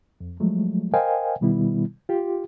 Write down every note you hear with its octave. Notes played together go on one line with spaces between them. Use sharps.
F2
F3 F#3 G#3 A3
A#4 C5 D#5 F5 G5 G#5
B2 D#3 G3 B3 E4
F4 G4